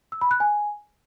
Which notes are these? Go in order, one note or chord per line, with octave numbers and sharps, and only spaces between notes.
E6
B5
F#6
G#5